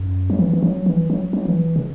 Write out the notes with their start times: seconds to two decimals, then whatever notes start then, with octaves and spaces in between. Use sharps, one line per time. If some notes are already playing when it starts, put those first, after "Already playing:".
Already playing: F#2
0.30 F#3
0.39 E3
0.53 E3
0.62 F#3
0.86 E3
1.10 F#3
1.33 F#3
1.45 E3
1.76 C#3